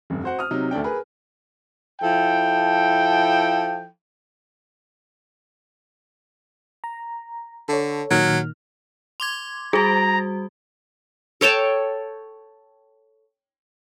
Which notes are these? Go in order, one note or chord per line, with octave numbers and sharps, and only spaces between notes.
F1 G2
F#4 C5 F#5
D#6 F6
C3 F#3 D#4
D2 A3 D4 G5
G#4 A#4 B4
F3 E4 A4 G5
A#5
D3 A4 C#5
A#2 D#3 F#3 F6
C6 D6 G#6
G3 F#4 G#4 A#5
A4 C#5 G5 A5